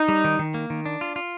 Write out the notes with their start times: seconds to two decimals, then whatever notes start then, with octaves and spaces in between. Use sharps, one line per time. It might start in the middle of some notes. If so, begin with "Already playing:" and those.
Already playing: D#4
0.09 G3
0.24 D#3
0.39 D#3
0.54 A#3
0.70 D#3
0.86 D4
1.01 F4
1.16 F4